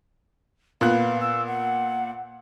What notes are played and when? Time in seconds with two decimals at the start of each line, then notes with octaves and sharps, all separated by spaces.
0.81 A#2 B3 F5 F#6
1.21 E6
1.47 F#5